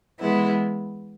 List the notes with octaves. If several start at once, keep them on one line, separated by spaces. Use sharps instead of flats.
E3 G#3 B3 E4